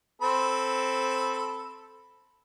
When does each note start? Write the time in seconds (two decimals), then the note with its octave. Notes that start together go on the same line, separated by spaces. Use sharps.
0.22 C4 A4 B5